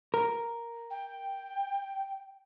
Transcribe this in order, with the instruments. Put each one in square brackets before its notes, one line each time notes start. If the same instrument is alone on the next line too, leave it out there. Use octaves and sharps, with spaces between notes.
[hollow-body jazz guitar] A#4
[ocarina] G5